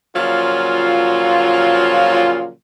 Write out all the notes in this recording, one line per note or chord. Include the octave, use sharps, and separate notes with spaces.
A#2 C#3 F3 F#3 F4